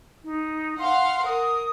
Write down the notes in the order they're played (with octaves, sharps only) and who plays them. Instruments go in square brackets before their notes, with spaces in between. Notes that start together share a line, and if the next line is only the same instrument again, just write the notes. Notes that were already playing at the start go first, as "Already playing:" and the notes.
[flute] D#4
[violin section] F5 F#5 [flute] C6
[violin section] A#4 [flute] D#6